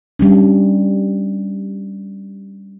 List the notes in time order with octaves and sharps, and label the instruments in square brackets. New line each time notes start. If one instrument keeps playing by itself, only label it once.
[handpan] G3 C#4 D4